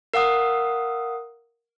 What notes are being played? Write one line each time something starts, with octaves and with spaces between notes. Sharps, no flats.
A#4 F5 F#5 D#6